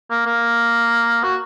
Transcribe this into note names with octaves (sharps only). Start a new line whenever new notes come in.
A#3
A#3
F#4